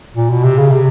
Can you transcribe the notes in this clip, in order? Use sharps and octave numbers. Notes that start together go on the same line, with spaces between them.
A#2
B2
C3
C#3
C3